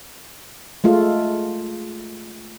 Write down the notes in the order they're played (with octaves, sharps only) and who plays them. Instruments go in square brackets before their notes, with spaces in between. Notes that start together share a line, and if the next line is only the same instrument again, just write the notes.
[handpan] G#3 A3 F4